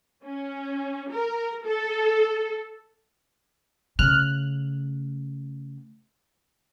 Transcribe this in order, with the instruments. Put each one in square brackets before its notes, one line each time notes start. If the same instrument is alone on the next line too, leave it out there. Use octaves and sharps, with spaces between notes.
[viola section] C#4
A#4
A4
[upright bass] C#3 A3 [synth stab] F6 F#6